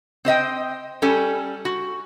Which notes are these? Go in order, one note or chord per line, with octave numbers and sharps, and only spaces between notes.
C4 C5 D#5 G5
G3 C#4 A4 G#5
F#4